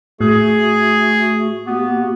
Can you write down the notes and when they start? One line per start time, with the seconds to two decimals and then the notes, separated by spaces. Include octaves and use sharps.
0.21 A2 A3 F#4 G#4
1.66 A#3 B3 F#4 G4